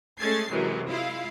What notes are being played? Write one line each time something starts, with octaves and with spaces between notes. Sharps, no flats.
G#3 A3 C#4 G#6 A6 C7
F#2 C3 E3 F#3 G#3
G#3 E4 F4 F5